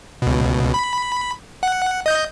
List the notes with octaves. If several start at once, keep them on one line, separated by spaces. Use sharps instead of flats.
C#2 B2
B5
F#5
D#5 G6